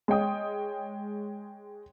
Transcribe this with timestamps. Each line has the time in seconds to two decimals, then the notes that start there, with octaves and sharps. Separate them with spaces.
0.08 G#3 C#5 G5 D#6